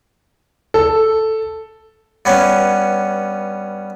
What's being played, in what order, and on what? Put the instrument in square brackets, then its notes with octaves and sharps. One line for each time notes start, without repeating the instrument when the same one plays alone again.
[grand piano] A4
[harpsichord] G2 B3 C#4